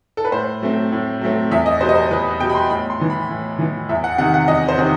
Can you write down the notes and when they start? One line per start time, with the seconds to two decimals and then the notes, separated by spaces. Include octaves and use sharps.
0.17 A4
0.25 B4
0.32 A2 C5
0.62 F#3 A3 C4
0.92 A2
1.21 F#3 A3 C4
1.51 E2 E5
1.66 D#5
1.81 B2 G3 B3 C5
1.89 D#5
1.95 C5
2.11 E2 B4
2.40 B2 G3 B3 G5
2.49 B5
2.55 C6
2.70 A2 B5
2.90 C6
3.00 E3 B3
3.10 B5
3.29 A2
3.59 E3 B3
3.89 E2 E5
4.04 F#5
4.18 C3 D#3 F#5
4.34 F#5
4.48 E2 D#5
4.68 C5
4.78 C3 D#3